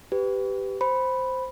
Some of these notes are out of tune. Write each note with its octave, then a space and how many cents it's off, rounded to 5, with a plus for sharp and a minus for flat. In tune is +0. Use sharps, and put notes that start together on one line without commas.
G4 +0 B4 +20
C5 -5 B5 +0